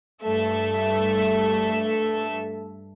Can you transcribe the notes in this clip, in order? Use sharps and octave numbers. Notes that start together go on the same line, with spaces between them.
G2 A3 A4 E5